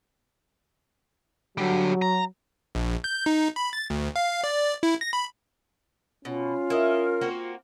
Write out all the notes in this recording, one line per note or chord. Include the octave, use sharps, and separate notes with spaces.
D3 F#3 G3
A#5
A#1
G6
D#4
B5
A6
D2
F5
D5
E4
A#6
B5
B2 C#4 F4
E4 A#4 D#5
A#3 C4 F#4